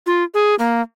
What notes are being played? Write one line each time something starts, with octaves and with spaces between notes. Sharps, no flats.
F4
G#4
A#3